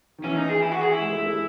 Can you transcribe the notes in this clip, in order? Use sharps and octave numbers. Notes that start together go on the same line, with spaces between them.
D#3
E3 C#4
D#4
G#4
E4
F#4
G#4
E4
G#3
A3
A3